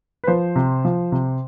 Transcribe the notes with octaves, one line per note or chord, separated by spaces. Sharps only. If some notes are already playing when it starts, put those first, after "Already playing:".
B4
F3 C5
C3
F3
C3